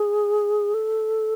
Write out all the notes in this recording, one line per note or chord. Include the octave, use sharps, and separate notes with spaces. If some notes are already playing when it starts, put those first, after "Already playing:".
Already playing: G#4
A4